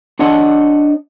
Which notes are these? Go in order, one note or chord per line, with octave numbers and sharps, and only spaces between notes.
D4 C#5 D#5 F#5 A5